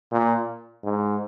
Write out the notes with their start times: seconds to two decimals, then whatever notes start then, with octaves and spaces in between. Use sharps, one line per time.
0.12 A#2
0.84 G#2